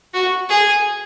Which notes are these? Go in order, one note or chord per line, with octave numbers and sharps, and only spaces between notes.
F#4
G#4